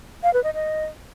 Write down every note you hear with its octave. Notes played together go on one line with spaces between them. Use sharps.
F5
B4
D#5
D#5